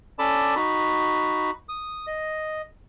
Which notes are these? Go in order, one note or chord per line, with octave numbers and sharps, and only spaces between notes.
C#4 A4 D5 A5 B5 D6
D#4 F#4 B5
D#6
D#5